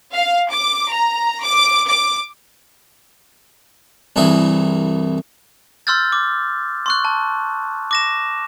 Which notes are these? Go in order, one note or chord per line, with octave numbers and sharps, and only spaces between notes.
F5
D6
A#5
D6
D6
C2 G2 E3 E4 G#4
C6 E6 F6 G6 A6
D6
C6 C#6 F#6
A5
D6 A#6 E7